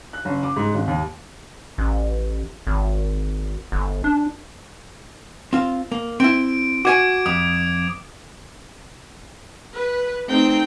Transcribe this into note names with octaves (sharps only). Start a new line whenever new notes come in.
F#6
F#1
D6
G#2
G#1
D#2
A1
G#1
G1
D4
C4 F4
A#3
C4 E4 D7
F#4 C#5 G#5 D6 G#6 D7
F2 D#6
B4
A3 C4 D#4 G5